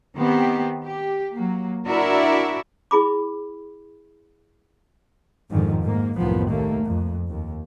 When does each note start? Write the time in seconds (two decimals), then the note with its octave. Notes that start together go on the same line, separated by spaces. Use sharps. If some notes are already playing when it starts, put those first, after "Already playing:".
0.17 D#3 B3 C4 G4
0.84 G4
1.32 F#3 A#3
1.86 D4 E4 F#4 A#4 D5 E5
2.91 E4 G#4 B5 D6
5.49 F2 G#2 D3 D#3 F3
5.82 G#2 A#3
6.17 C2 F#2 A2 D#3 F3 B3
6.47 D#2 A3 A#3
6.86 F2
7.28 D#2